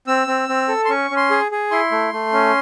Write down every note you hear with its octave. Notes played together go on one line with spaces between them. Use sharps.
C4 E6
C4
C4
A4
C6
C#4 C#6
C#4
C6
G#4
G#4
E4 C6
A3
A3
C#4